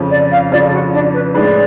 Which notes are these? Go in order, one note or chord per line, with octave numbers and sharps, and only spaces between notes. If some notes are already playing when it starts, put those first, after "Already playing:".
Already playing: F2 C#3 F3
D5
F5
F2 C#3 F3 D5
F#4
D4
B4
A2 G#3 D4 G#4 B4 D5